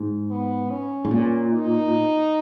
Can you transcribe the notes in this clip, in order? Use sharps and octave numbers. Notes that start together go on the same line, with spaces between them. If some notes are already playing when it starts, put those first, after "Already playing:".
Already playing: G#2
B3
C#4
G#2
A#2
D#4